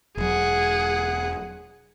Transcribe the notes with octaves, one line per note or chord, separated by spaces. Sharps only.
E1 F#3 G#4 F#5